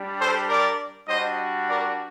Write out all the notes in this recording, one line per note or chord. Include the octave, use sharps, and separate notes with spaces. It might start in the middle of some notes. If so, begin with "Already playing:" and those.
Already playing: G3 D4 G4
A4 C5
A#4 D5
G3 D4 F#4 C5 D#5
A#4 D5